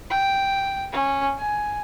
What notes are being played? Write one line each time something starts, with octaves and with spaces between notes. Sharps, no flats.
G5
C#4
G#5